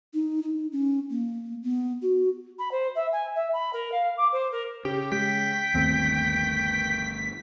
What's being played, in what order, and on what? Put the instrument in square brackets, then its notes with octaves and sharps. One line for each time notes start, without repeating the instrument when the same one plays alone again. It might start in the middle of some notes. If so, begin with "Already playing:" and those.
[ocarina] D#4
D#4
C#4
A#3
B3
F#4
B5
C5
E5
G#5
E5
B5
A#4
F5
D6
C5
A#4
[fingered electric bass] C#3 [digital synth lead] G4
[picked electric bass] G#3 [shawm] G5 [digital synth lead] B6
[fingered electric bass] G1 A3 [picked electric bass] D#2 C4